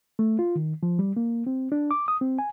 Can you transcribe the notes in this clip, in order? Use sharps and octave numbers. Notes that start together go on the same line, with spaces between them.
A3
F4
D#3
F3
G3
A#3
C4
D4
D6
D#6
C4
G#5